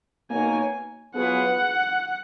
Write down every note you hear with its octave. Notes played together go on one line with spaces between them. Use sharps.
B2 A#3 D#4 A#4 C#5 G#5
F#3 B3 F4 G#4 B4 F#5